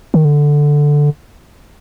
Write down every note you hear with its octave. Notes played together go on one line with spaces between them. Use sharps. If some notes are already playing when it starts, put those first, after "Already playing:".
D#3
D3